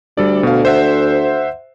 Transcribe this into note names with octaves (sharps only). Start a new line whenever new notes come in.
D2 G3 A4 D5
B2 F5
C5 E5 F#5